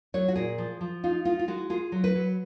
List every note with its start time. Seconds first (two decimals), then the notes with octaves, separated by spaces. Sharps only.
0.14 F#3 C#5
0.28 F#4
0.35 A#2 G#4
0.58 F3
0.81 F3
1.04 D#4 F4
1.25 D#4 F4
1.39 F4
1.48 G#3 F#4
1.70 F4 G#4
1.92 F#3
2.04 B4
2.15 F#3